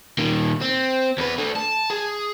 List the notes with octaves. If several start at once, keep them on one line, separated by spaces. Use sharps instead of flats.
A#2 D#3
C4
E2 B4
A3 D4
A5
G#4